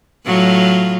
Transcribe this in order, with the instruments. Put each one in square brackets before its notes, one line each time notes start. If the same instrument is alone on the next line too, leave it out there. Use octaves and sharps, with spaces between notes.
[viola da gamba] A2 F#3 F4